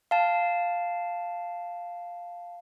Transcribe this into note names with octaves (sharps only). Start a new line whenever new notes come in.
F5 A5